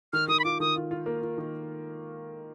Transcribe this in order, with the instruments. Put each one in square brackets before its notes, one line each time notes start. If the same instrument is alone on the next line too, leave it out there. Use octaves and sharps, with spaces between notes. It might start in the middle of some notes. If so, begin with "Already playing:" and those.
[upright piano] D#3 [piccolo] F6
[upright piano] D#3 [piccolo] D#6
[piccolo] B5
[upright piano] F4 [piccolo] D6
[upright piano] D#3 [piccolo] D#6
[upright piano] F4
F4
A#3
F4
D#3